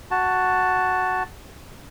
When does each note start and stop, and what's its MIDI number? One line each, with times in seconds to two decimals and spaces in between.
0.11 1.23 66
0.11 1.23 81